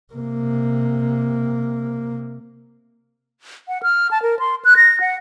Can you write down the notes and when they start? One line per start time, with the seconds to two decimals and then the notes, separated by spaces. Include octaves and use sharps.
0.13 C3 A#3
3.68 F#5
3.83 F6
4.11 A5
4.22 A#4
4.39 C6
4.65 F#6
4.77 A#6
5.01 F#5